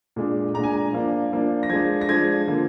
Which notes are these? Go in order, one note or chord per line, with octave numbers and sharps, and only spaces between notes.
A#2 G#3 D4
A#2 G#3 D4 A#5
G#5
A#5
F3 A#3 D4
F3 A#3 D4
A#6
F3 G#3 D4 G#6
A#6
F3 G#3 D4 G#6
D3 F3 A#3